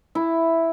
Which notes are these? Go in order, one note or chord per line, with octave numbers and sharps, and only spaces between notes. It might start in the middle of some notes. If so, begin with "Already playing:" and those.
E4